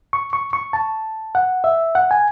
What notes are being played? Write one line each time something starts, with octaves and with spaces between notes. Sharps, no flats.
C#6
C#6
C#6
A5
F#5
E5
F#5
G#5